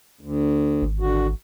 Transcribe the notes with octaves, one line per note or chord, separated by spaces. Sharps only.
D2
G#1
D3 F#4